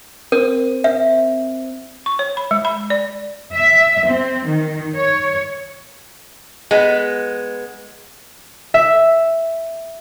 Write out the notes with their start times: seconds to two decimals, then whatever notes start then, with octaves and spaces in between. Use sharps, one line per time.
0.32 C4 A#4
0.84 E5
2.06 C#6
2.19 C#5
2.37 B5
2.51 G#3
2.65 B5
2.90 D5
3.54 E5
4.09 C4
4.46 D#3
4.96 C#5
6.71 G#3 B3
8.74 E5